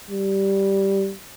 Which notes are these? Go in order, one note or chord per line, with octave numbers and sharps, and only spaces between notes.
G3